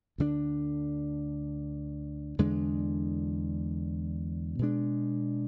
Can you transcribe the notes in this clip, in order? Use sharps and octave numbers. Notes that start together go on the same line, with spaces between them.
D2 D3 A3 D4
E2 D3 G#3 D4
B2 G#3 D4